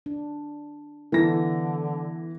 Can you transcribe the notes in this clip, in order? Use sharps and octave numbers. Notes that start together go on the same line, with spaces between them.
D4
D3 E3 G3 B3 A4 A#6